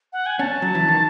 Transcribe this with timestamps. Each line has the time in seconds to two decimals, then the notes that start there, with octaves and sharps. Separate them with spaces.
0.13 F#5
0.26 G#5
0.39 C#4 A5
0.62 F#3
0.75 E3
0.88 D#3